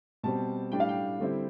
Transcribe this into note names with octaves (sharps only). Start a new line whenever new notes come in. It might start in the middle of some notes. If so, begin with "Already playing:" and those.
B2 G3 C4 A5
A2 G3 D4 G5
F5
G5
D3 G3 C4 E4